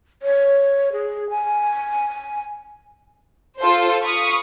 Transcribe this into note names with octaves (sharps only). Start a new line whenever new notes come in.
C#5
G#4
G#5
F4 A4 C5
F5 B5 C#6 D#6